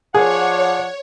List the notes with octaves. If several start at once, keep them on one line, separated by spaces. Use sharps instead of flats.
F3 G#4 C#5 D5 F#5